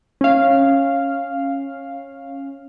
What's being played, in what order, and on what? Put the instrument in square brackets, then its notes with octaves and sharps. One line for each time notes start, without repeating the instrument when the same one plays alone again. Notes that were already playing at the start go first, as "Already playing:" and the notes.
[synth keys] C#4 F5